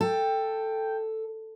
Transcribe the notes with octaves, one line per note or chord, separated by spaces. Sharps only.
A4 G5